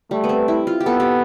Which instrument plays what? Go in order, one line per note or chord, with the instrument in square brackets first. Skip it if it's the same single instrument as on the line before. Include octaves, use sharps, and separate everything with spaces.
[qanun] G3 [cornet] A3
[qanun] B3
C4
E4
F4
G4
[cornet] B3 [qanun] A4
[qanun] G4